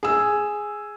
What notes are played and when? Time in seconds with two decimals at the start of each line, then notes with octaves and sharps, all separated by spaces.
0.03 G#4 E6